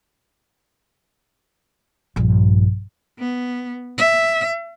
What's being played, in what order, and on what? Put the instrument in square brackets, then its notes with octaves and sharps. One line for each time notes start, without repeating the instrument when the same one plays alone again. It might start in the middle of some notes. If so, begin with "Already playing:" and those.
[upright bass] A#1 G2
[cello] B3
E5